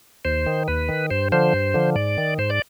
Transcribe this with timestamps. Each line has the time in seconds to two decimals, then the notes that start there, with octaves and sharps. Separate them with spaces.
0.25 D#2 C5
0.46 D#3
0.68 D#2 B4
0.89 D#3
1.10 G2 C5
1.32 D3 F3 C5
1.53 G2
1.74 D3 F3
1.95 G#2 D5
2.18 D#3
2.38 G#2 C5
2.50 D5